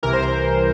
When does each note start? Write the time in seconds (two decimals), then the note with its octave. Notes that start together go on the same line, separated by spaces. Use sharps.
0.03 C2 C3 E3 A#4
0.13 C5
0.22 A#4